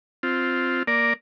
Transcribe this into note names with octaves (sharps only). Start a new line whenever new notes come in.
C4 F4
A#3 A#4 D5